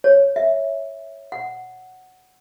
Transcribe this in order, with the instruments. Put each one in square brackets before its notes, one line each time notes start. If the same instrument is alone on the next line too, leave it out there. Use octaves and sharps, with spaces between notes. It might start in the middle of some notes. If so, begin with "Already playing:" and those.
[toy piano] C#5
E5
F#5